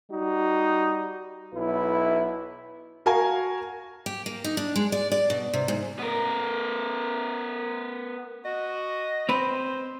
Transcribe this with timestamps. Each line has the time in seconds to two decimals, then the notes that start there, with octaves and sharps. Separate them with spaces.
0.11 G3 D#4 F#4
1.54 B1 E4 B4
3.06 F#4 A#4 F5 G#5
4.06 G4
4.26 A#3
4.44 D#4
4.57 D4
4.76 G#3
4.92 D5
5.12 D5
5.30 B2
5.53 C3
5.68 G#2
5.99 B3 A#4
8.45 F#4 D#5
9.29 C4 B4 C5